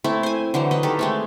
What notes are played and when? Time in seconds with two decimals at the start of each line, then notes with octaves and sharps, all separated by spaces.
0.04 A3 C4 E4
0.23 C5 G#5
0.54 D3 E3 F#3 C5
0.71 B4 D#5
0.83 D#3 G4 A4
0.99 G#3 A3 C4